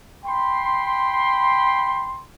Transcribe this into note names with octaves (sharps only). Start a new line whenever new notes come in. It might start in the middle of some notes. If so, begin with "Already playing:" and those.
G5 B5 C6